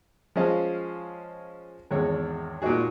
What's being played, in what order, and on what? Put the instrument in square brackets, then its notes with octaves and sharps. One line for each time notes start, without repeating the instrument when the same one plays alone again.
[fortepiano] F3 G#3 C#4 D#5 F5
G#1 E2 G#3 C#5
A#2 G#3 D#4 F#4 G#4